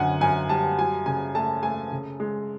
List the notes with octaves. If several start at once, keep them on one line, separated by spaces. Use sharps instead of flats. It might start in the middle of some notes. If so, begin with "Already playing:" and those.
Already playing: F#2 D3 F#5 G#5
F#2 G#5
G3 A5
F#3 G#5
C#3 G#5
A3 A5
A3 G#5
C#3
G#3